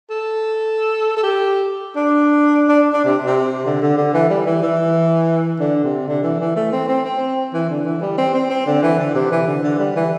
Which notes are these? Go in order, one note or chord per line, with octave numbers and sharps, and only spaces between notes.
A4
A4
G4
D4
D4
D4
C3
C3
D3
D3
D3
E3
G3
E3
E3
D3
C3
D3
E3
E3
A3
C4
C4
C4
E3
D3
E3
G3
C4
C4
C4
D3
E3
D3
C3
E3
D3
D3
G3
E3